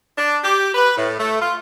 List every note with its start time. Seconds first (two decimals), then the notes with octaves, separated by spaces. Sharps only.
0.17 D4
0.44 G4
0.75 B4
0.97 A2
1.19 A3
1.41 F4